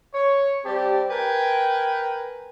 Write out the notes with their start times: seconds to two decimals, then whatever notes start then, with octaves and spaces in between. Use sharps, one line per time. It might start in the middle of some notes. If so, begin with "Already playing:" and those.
0.13 C#5
0.65 G3 C4 G4 A5
1.10 A#4 B4 G5 G#5